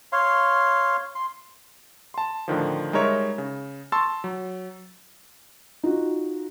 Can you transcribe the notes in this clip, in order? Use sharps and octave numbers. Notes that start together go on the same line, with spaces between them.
C#5 F5 C6
C6
A5 C6
A2 D3 D#3 F3
G3 G#3 D#4 A#4 C#5 E5
C#3
A5 C6 C#6 E6 A6
F#3
D#4 F4 F#4